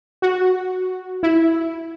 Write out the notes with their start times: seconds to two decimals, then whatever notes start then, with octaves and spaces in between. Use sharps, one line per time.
0.22 F#4
1.23 E4